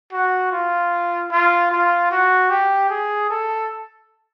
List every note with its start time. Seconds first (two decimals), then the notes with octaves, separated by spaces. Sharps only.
0.12 F#4
0.52 F4
1.31 F4
1.71 F4
2.11 F#4
2.50 G4
2.90 G#4
3.30 A4